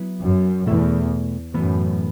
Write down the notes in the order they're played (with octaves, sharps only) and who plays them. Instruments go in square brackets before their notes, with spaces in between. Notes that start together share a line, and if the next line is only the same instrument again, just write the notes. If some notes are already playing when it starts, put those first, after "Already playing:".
Already playing: [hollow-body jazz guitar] F#3 B3 E4
[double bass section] F#2
[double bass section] E2 [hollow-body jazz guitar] B2 A3 E4 A4 E5
[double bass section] F#2 [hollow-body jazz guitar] A2 E3 B3